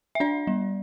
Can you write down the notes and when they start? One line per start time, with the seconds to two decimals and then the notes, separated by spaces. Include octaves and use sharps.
0.15 E5
0.20 D4 D5
0.47 G3